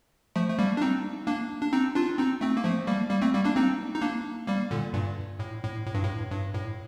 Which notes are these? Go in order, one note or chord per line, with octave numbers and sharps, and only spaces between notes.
F3 A3
A3
G3 A#3
D4
C4 D#4
A#3 D4
D4
C4 D#4
D4 F4
C4 D#4
A3 C4
A#3
F3 A3
G3 A#3
G3 A#3
A3 C4
G3 A#3
A#3 D4
C4 D#4
D#4
A#3 D4
G3 A#3
A#2 D3
G2 A#2
A2
A2
A2
G2
A2
G2
A2